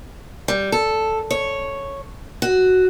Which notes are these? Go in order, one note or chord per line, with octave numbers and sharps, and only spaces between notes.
G3
A4
C#5
F#4